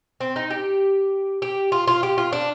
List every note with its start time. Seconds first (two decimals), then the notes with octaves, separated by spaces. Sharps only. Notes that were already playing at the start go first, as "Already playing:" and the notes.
0.20 C4
0.36 D#4
0.50 G4
1.42 G4
1.72 F4
1.88 F4
2.03 G4
2.18 F4
2.33 D4